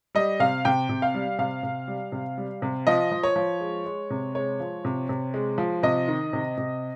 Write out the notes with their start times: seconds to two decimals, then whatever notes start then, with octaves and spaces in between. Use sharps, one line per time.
0.15 G3 D#5
0.40 C3 F5
0.65 C3 G5
0.89 C3
1.02 F5
1.14 G3
1.39 C3 F5
1.63 C3
1.88 G3
2.12 C3
2.38 G3
2.62 C3
2.87 F3 D#5
3.12 F3
3.23 C#5
3.36 F3
3.60 G#3
3.86 G#3
4.10 C3
4.35 G#3 C#5
4.60 F3
4.85 C3
5.09 C3
5.34 G#3
5.58 F3
5.83 C3 D#5
6.08 D#3
6.33 C3
6.58 C3